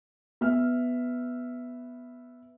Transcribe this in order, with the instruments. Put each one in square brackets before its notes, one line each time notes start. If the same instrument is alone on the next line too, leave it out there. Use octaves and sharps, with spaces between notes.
[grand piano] B3 E5 F6